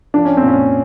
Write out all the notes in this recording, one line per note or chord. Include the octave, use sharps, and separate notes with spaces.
F3 D4
C#4
C4
A#2
C#4